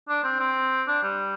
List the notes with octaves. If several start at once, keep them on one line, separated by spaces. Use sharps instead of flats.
D4
C4
C4
D4
G3